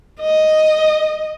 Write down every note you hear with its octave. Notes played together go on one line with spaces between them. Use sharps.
D#5